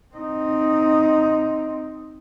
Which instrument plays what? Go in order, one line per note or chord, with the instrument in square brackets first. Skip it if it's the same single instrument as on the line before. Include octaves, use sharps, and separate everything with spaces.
[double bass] C4 D#4